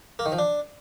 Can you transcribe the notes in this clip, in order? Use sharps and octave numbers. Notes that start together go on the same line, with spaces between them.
A#3
D#3
F3
D4